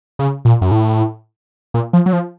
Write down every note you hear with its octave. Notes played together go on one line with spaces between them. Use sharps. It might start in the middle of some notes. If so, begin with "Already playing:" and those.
C#3
A#2
F#2
A2
A#2
F3
F#3
F3